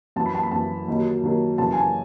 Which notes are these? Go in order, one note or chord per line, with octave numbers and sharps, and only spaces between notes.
F#2 E3 A5
B5
A5
B5
F#2 E3 A5
D#2 D#3 F#3
D#2 D#3 F#3
F#2 C#3 E3 A5
G#5
A5